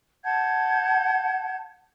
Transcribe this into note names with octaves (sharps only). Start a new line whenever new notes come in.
F#5 A5 G6 G#6